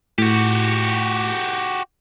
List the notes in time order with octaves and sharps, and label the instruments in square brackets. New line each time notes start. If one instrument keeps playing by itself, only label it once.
[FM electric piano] A2 [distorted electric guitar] F#4 G4